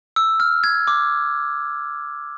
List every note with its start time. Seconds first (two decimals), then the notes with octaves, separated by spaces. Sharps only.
0.16 E6
0.40 F6
0.64 G#6
0.87 D6